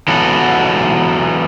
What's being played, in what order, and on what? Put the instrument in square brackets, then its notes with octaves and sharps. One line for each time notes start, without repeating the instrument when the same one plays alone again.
[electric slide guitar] E3 F#3 B3 F#4 A4